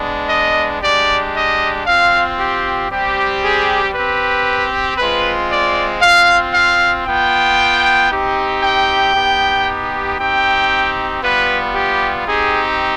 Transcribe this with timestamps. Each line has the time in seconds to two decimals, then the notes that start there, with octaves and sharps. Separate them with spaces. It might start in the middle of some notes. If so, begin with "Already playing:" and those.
Already playing: G#3 B3 D4
0.30 D#5
0.82 G#3 D4 G4 D5
1.34 D#5
1.86 C4 F4 F5
2.38 G4
2.90 G3 C4 G4
3.42 G#4
3.94 C4 G4 B4
4.97 G#3 C4 F4 B4
5.50 D5
6.02 C4 F4 F5
6.54 F5
7.06 B3 F4 G5
8.10 C4 D#4 G4
8.62 G5
9.14 B3 D#4 G4
10.18 C4 D#4 G4 G5
11.22 G3 B3 F4 B4
11.74 G4
12.26 C4 D#4 G4 G#4